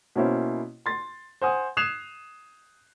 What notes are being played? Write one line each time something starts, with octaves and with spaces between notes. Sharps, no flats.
B2 A#3 C#4 E4 C5
C6 A6
C5 F#5 G#5 D#6
D#6 F#6 G#6 C7 E7 F7